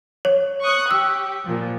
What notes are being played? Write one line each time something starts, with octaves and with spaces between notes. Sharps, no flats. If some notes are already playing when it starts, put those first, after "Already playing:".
C#5
C#6 D#6 F#6
G4 E6
A#2 F3